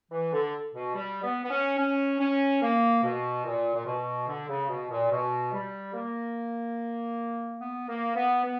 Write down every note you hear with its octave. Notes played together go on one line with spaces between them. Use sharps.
E3
D3
B2
G3
B3
B3
C#4
C#4
C#4
A#3
B2
A#2
A#2
B2
D3
C#3
B2
A#2
B2
G3
A#3
B3
A#3
B3
B3